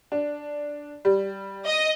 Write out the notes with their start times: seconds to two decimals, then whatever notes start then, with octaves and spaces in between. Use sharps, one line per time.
0.12 D4
1.05 G3
1.65 D#5